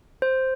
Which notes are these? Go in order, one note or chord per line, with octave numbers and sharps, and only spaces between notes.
C5